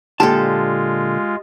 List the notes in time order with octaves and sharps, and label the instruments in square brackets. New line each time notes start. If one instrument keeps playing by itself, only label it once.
[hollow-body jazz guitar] A#2 D3 A5 [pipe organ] G#3 F4 [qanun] G4 A4